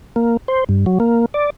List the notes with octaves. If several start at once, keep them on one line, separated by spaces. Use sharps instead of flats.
A#3
C5
G2
F#3
A#3
D5